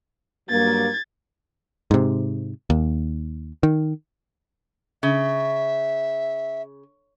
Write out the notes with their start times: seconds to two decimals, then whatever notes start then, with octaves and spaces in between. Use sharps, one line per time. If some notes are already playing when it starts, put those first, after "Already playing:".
0.49 G2 F#3 A#3 G#6 A6
1.91 G#2 C3
2.70 D#2
3.63 D#3
5.03 C#3 E5